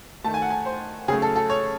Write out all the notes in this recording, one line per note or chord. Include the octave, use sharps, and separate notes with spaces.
D#3 A3 A5
G#5
F#5
G#5
C5
C#3 F#3 A3 G#4
A4
A4
C#5